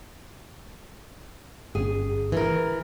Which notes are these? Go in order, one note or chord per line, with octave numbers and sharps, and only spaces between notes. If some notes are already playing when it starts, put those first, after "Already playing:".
G1 B2 C#4 G#4
E3 A#4